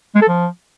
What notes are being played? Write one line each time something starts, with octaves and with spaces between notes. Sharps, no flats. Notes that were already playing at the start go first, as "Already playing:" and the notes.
G#3
A4
F3